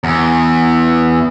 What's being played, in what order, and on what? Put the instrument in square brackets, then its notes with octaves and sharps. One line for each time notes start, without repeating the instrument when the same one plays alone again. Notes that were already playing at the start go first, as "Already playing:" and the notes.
[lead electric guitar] E2